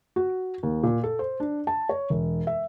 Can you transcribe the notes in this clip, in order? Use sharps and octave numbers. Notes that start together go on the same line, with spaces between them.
F#4
D#2
A#2
A4
C5
D4
A5
C#5
E1
E5